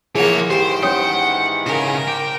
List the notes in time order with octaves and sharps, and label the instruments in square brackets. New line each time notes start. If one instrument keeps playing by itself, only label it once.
[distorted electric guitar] E3 F3 [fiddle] A#3 C#5 [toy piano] G#4 F#5
[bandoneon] G#2 D#3 E3 [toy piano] G4 [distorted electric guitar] C5 [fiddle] G5
[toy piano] C#4 C#5 D#6 [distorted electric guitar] F#5
[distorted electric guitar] C#3 [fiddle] A#4
[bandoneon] C5 D6 [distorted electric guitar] G5